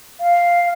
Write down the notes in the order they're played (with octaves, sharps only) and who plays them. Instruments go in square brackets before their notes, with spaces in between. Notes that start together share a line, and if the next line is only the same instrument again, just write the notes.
[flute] F5